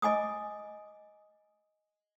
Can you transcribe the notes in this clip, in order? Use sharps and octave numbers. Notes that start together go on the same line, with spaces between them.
D#5 G#5 D6 D#6